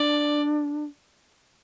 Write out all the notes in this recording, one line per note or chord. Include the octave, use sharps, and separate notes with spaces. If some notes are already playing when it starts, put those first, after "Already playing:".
Already playing: D4 D5